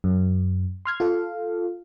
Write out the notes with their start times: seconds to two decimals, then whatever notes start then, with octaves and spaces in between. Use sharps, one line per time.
0.04 F#2
0.85 C6 F6 G#6
1.00 F4 A4 F5